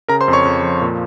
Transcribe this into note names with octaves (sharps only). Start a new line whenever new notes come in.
C#3 A#4 A#5
C5 C6
F2
C#5 C#6
F2
F3
A#2